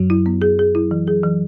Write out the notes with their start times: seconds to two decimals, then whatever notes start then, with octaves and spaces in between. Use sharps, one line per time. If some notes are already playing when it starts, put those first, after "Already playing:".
Already playing: F#2 F#3
0.10 E4
0.26 B3
0.42 G#4
0.59 G#4
0.75 E4
0.91 E3
1.07 G#4
1.24 E3